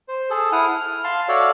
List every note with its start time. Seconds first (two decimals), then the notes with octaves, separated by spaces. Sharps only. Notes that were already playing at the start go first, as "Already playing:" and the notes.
0.08 C5
0.30 G#4 A4
0.52 E4 F#5 D#6 F6
0.69 F6
1.04 F5 A5 C6
1.29 F#4 A4 C#5 D5 E5 F5